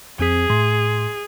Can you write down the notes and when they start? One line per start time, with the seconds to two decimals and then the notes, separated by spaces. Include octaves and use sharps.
0.19 F2 C4 G#4 B6
0.50 A2 C6